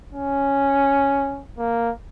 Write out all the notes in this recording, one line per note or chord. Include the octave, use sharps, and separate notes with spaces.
C#4
A#3